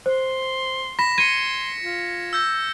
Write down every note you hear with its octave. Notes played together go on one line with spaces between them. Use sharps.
C5 C6
B5 A#6 B6 E7
C6 G#6 C#7 D#7
F4
E6 G6 A#6